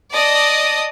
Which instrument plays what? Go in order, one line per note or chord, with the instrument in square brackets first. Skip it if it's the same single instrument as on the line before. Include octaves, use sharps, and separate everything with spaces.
[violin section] D5 D#5 A5 D#6